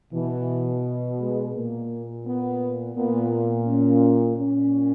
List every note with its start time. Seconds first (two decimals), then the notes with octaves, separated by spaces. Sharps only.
0.13 B2 E3
1.19 G#3
1.54 A#2 A#3
2.26 B3
2.96 A#2 B3
3.66 C#4
4.36 A#2 C#4